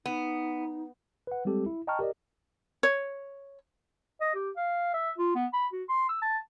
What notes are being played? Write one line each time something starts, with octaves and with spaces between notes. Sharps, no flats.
B3 D#4
B4 F#5
G3 G#3 C4 G4 A4
E4
D#5 G5 A5 A#5 C#6 F6
G4 A#4 D5 D#5
C#5
D#5
G4
F5
E5
F4
B3
B5
F#4
C6
E6
A5